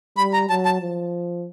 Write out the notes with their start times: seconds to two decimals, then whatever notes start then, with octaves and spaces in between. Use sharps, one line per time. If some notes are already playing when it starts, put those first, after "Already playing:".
0.17 G3 B5
0.33 A#5
0.49 F#3 A5
0.65 A5
0.81 F3